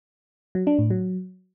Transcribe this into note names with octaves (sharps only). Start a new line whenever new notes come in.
F#3
D4
A2
F#3